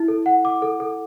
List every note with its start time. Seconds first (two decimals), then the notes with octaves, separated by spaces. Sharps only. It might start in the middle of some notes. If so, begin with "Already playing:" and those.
Already playing: E4
0.08 A4
0.26 F#5
0.45 D6
0.62 A4
0.80 A4